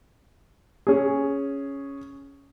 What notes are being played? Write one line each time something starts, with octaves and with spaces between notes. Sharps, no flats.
C#4 G#4